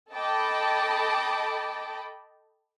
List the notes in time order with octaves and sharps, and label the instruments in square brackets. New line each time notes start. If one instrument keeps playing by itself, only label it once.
[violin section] A4 D#5 G5 A5 B5 D6